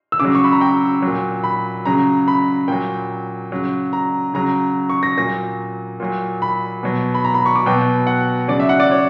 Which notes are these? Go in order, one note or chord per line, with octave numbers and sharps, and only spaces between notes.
E6
C#3 F#3 D6
C#6
B5
A#5
G5
A#2 F#3
B5
C#3 F#3 A#5
B5
A#2 F#3 G5
C#3 F#3
A#5
C#3 F#3 A#5
C#6
A#6
A#2 F#3 A#6
A#2 F#3
B5
B2 F#3
B5
A#5
B5
C#6
D6
B2 F#3 G5
F#5
C#3 F#3 D5
E5
F#5
D5
C#5